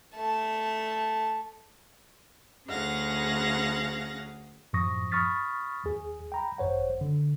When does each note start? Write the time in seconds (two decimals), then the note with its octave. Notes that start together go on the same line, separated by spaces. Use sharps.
0.15 A3 A5
2.69 D2 C#4 G#4 F5 F#5 A#6
4.73 F#2 A2 F3 C#6 D#6 A#6
5.12 B5 C#6 D#6 F6 A6 B6
5.85 D#2 G#4
6.32 G5 A#5 B5
6.58 G#1 F#2 C5 C#5 F#5
7.01 D3